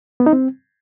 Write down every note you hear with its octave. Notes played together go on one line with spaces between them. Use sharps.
B3
D#4
C4